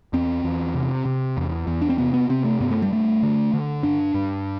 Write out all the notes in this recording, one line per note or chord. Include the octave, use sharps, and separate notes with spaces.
E2 C4
E2
C3
C3
E2
E2
D4
C4
C3 B3
B3
C3 C4
A3
G2 B3
A3
G3
G2 A3
D3
D3
G2 D4
G2